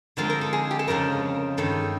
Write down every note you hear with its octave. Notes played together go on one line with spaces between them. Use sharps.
D3 F3 G#3 C4 F4 A#4
A#4
A4
G#4
G4
A4
F2 C#3 F3 G#3 A#4
G2 D#3 G#3 A4